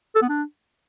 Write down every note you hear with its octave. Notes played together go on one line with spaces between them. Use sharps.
A4
B3
D4